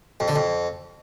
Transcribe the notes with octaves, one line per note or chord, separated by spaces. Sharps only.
F2
D3
F2